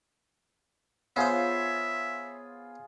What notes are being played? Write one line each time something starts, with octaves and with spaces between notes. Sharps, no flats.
B3 F4 G#4 C5 C#5 E5 F5